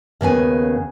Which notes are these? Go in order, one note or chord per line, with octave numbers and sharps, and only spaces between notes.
D#2 C#3 B3 G#5